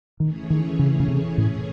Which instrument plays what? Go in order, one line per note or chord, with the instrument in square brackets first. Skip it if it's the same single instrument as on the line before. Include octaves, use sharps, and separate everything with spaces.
[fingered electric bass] D#3 [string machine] E3 A3 C#4 G#4 C#5
[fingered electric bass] D#3
C#3
C#3
C3
A2